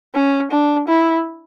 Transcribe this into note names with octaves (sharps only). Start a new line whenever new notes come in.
C#4
D4
E4